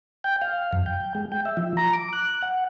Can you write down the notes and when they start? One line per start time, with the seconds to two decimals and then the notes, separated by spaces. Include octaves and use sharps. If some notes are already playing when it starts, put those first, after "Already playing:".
0.24 G5
0.42 F5
0.73 F#2
0.86 G5
1.15 G#3
1.32 G5
1.45 E5
1.57 F3
1.77 A#5
1.93 D6
2.13 F#6
2.42 F#5